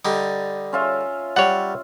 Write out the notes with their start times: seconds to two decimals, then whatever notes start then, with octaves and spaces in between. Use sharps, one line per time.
0.05 D3 G3 D#4
0.73 C#4 F4 E5
1.36 G3 C#5 F#5